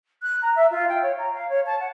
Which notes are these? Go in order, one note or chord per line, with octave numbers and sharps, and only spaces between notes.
F#6
A#5
E5
F4
G5
C#5
A#5
F5
C#5
A5
F#5